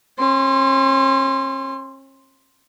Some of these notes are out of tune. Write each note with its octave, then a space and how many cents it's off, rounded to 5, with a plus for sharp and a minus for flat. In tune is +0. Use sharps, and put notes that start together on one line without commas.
C#4 -40 C6 +0